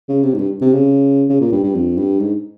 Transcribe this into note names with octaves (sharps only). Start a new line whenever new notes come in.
C#3
C3
G#2
G2
C3
C#3
C#3
A#2
G2
G2
F2
G2
G#2